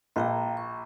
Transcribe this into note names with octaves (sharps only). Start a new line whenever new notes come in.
A#1 F5 G5 A#5
C#6